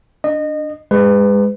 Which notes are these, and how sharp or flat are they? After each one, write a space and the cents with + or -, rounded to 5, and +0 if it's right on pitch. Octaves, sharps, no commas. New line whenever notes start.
D4 +0 D#5 -25
G#3 -25 B4 +25